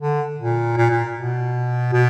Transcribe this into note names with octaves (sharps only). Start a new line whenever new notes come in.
D3
A#2
A#2
A#2
B2
B2